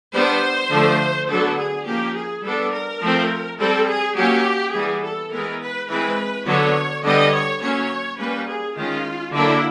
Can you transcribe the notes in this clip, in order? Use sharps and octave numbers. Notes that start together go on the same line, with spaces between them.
G3 B3 D4 C5
D3 F3 A3
D3 F#3 B3 D4 A4
G#4
F3 A#3 C#4 G4
G#4
G3 B3 D4 A4
A#4
F3 A3 C4
G3 C4 A4
G#4
F#3 A#3 C#4 G4
E3 G3 B3 G#4
A4
E3 G#3 B3 A#4
B4
E3 G#3 C4 B4
D3 F#3 B3 C#5
D3 G3 B3 D#5
C#5
F#3 A#3 C#4 C#5
G3 A#3 C#4 B4
G#4
D#3 G#3 C#4 F4
D3 F#3 A#3 D4 E4